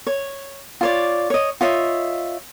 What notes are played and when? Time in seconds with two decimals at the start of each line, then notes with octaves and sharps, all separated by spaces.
0.07 C#5
0.81 F4 C#5 D5
1.30 C#5 D#5
1.61 F4 C#5 D#5 E5